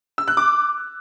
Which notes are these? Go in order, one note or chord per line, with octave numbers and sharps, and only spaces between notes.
E6
F#6
D6